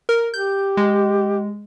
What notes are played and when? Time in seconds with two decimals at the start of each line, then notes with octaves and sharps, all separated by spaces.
0.09 A#4
0.34 G4 G6
0.77 G#3